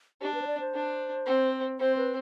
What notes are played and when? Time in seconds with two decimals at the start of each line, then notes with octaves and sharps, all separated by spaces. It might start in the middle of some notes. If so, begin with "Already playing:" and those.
0.21 D4 G4
0.34 B4
0.42 C5
0.47 D5
0.60 C5
0.74 D4
1.26 C4
1.79 C4 C5
1.97 B4